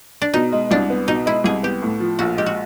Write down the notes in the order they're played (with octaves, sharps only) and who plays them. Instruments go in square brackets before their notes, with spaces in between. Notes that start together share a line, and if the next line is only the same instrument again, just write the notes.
[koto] D4
[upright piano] B2 [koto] D#4
[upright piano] G#3
[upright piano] C2 [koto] D4
[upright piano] B3
[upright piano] B2 [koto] D#4
[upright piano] G#3 [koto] E4
[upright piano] C2 [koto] G#4
[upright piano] B3 [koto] G4
[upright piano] A2
F3
[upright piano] A#1 [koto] F#4
[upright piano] G#3 [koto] G4
[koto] F#4